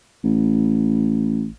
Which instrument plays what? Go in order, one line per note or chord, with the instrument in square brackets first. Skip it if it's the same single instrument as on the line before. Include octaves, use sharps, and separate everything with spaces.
[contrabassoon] A1